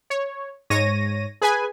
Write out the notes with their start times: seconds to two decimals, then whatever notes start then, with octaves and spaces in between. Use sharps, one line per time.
0.10 C#5
0.70 G#2 C#5 A#6 D#7
1.41 G#4 B4 G#5